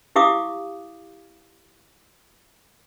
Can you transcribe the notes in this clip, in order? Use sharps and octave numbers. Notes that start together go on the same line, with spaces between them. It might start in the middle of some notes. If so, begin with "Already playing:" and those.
E4 G4 F5 D6 D#6